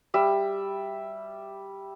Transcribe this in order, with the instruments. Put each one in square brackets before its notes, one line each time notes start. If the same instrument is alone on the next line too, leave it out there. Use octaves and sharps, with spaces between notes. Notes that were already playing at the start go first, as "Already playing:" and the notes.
[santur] G3 E5